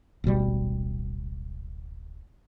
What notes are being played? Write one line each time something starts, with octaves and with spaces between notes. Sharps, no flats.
D1 G#1 B2 G3